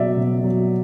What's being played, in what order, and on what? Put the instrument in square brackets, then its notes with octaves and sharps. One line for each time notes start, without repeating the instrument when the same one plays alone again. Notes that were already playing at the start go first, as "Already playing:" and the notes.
Already playing: [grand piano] B2 F#3 D5 E5
B2
F#3